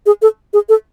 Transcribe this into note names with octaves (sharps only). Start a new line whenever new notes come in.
G#4
A4
G#4
A4